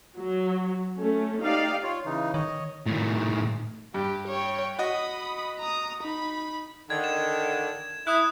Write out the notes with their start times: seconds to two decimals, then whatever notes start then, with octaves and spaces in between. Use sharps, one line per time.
0.19 F#3
0.98 A3 C#4
1.41 D#4 G4 D5 F5
1.83 F4 C#5
2.06 C#3 E3 D#4
2.34 D#3 C#5 D#5
2.86 A2 D#3
3.94 G2 G4
4.28 C#5 G5
4.79 F#4 D#5 B5 D#6
5.59 A#5 D#6
6.03 D#4 B5
6.90 D3 D#3 G#6
7.04 E7
8.07 E4 D#6 F#6